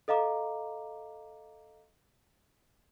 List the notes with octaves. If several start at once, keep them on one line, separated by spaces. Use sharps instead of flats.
A4 D#5 F5 A#5 D6